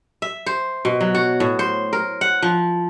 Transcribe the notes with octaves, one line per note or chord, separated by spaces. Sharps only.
E5
C5
B2
F#3
F#4
A2
C5
A#4
F#5
F3